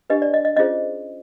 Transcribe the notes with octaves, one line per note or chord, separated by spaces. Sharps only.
D4 G4 B4 D#5
D5
D#5
D#5
C#4 F4 G#4 C5 D#5